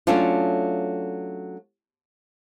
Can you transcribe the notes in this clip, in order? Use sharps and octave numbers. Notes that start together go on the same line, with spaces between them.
F#3 A3 C#4 D4 F4